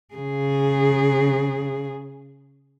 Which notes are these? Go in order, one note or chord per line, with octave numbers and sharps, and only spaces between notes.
C#3 G#4